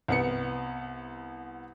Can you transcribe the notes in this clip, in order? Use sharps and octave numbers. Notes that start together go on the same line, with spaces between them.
C2 B3 C#7